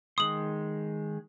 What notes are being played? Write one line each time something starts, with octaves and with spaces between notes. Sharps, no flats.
D#3 G#3 C6 D#6 F#7